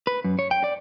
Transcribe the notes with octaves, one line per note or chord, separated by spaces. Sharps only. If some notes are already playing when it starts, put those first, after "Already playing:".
B4
F#2
C#5
G5
D5